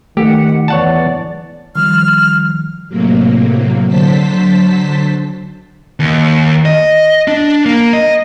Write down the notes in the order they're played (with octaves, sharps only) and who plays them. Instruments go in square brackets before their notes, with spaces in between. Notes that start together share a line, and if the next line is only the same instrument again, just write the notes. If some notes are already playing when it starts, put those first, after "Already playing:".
[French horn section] D#3 [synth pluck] A3 [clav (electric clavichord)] G4 [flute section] F#5
[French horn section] E2 E3 [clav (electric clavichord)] C#5 F#5 A5 [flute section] D5
[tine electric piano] D#3 F3 G3 [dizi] F6
[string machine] A2 C3 F#3 A#3
D3 F#3 C5 A5 B6
[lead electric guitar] D#2
D#5
D4
A#3
D#5